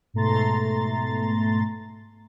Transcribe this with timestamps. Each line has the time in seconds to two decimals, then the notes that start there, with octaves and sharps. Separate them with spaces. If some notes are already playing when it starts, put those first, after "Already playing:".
0.14 G#2 B2 A3 A#5 C6 A6